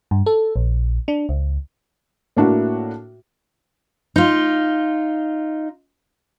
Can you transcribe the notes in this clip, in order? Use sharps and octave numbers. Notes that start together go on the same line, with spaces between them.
G2
A4
A#1
D4
C#2
A2 A#3 D4 E4 F#4
D#4 F4